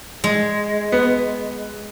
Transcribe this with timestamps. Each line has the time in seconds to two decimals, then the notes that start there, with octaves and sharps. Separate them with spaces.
0.24 G#3
0.92 B3